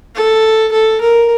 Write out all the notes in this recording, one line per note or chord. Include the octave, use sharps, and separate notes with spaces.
A4
A4
A#4